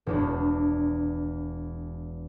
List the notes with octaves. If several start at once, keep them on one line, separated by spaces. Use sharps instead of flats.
E1 E2 D4